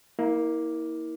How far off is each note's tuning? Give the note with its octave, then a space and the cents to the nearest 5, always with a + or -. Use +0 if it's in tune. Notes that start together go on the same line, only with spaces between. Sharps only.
A#3 +10 E4 -35